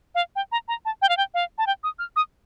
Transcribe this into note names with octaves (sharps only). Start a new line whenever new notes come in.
F5
G5
A#5
A#5
A5
G5
F5
G5
F5
A5
G5
D#6
F6
D#6